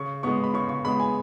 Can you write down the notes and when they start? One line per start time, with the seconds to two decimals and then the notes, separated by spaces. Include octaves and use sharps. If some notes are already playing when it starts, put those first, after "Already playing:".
Already playing: C#3 C#6
0.23 G#3 B3 C#6
0.44 B5
0.54 C#3 C#6
0.69 C#6
0.85 G#3 B3 B5
1.00 G#5